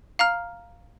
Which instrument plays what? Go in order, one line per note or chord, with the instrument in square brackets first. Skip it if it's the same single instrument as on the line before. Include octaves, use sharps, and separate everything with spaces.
[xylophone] F5 A#5 F6